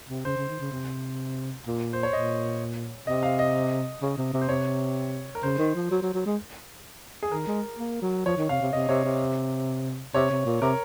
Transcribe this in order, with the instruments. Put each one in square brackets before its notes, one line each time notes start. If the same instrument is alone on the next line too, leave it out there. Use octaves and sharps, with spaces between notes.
[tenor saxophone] C3
[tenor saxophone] C#3 [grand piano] C5
[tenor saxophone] C#3
D#3
C#3
C3
A#2
[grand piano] C5
C#5
[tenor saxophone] A#2 [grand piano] D#5
[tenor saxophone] C3 [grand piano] D#5
[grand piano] F5
D#5
[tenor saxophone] C#3
C3
C3
[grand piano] C5
[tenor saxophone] C3 [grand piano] C#5
[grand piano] A#4
[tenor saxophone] C#3 [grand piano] C5
[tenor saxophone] D#3
F3
F#3
F#3
F#3
G#3
[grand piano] G#4
[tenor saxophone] D#3 [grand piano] A#4
[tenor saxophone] G#3
A#3
F#3
[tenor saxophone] F3 [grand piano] C#5
[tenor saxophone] D#3
[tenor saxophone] C3 [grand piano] F5
[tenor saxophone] C3
[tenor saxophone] C3 [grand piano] D#5
[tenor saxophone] C3 [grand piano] C#5
[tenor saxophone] C3
[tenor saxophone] C3 [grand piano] C#5
[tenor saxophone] C3
A#2
[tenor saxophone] C3 [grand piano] A#4